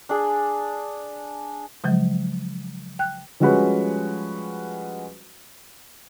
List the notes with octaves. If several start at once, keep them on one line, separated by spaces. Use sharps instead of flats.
D4 G#4
C#3 F3 F#3 G#3
G5 F#6
F3 G3 G#3 C#4 F#4 B4